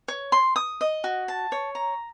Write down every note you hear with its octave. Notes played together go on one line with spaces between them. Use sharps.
C#5
C6
D#6
D#5
F#4
A5
C#5
A#5